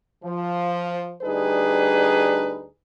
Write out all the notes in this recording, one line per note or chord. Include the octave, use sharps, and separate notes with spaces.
F3
D2 G3 D4 D#4 G#4 B4